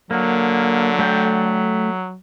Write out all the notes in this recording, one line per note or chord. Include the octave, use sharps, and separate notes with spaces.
D3 F#3 A#3
A3 G5